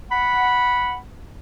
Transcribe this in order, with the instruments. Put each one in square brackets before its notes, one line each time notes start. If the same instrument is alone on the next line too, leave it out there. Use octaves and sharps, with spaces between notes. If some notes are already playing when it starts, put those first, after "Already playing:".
[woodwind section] F#5 B5